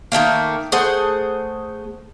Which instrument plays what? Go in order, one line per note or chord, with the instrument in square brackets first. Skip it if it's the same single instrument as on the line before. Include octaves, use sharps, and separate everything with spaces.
[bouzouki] D#3 E3 A3 A#3
A3 G#4 C5 F#5